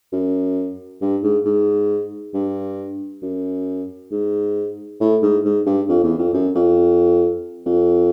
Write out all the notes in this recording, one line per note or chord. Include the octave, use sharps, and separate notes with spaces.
F#2
G2
G#2
G#2
G2
F#2
G#2
A2
G#2
G#2
G2
F2
E2
F2
F#2
F2
F2